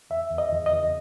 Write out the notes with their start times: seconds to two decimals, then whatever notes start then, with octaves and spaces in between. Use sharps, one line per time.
0.10 E2 E5
0.31 E2
0.38 D#5
0.52 E2
0.66 D#5
0.73 E2